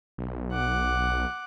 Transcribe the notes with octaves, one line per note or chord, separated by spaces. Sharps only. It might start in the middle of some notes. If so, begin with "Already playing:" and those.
B1
F#5 D6